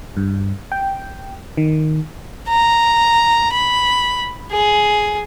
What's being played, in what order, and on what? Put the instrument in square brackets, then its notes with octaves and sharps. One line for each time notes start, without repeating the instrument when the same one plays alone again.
[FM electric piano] G2
G5
D#3
[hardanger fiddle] A#5
B5
G#4